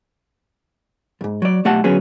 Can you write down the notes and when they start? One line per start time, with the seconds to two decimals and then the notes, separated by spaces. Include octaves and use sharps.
1.21 F2 G#2
1.42 F#3 D5
1.65 B1 A3 G4 F#5 A5
1.84 D2 F#3 B3 C#4 G#4